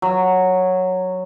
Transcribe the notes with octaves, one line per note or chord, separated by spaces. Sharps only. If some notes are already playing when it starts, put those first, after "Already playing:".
F#3